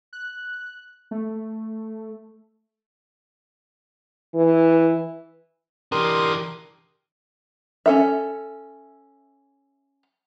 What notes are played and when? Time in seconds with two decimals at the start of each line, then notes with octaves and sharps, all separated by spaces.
0.13 F#6
1.11 A3
4.35 E3
5.92 E3 D4 G4 A#4 C6 D#6
7.86 C#4 A4 E5